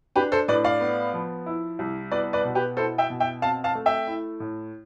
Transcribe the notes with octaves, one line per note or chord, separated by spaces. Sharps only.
D4 G4 B4
A4 C5
A2 B4 D5
D5 F5
B3
F3
E4
C2
B3 B4 D5
B4 D5
B2
G4 B4
E4 A4 C5
E5 G5
B2
E5 G5
C4 F5 A5
F5 A5
A3
E5 G5
E4
A2